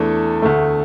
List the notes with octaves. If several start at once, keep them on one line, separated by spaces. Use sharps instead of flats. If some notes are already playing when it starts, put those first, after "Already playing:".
Already playing: E2 E3 A3 D4 A4
D2 D3 A3